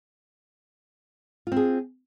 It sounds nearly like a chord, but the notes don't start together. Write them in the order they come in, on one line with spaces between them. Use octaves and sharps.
F4 C4 G#4